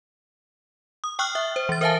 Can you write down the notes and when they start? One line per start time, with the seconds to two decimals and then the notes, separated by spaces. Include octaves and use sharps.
1.04 D#6
1.19 G5 C#6 D#6 F6 F#6
1.35 E5
1.56 C5
1.69 E3 A6
1.81 A#4 C5 E5 F5 G#5 A5